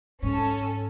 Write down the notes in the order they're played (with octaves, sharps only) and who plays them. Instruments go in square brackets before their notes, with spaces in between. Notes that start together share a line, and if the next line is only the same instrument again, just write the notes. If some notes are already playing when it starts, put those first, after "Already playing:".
[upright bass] G#2 [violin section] C#4 A4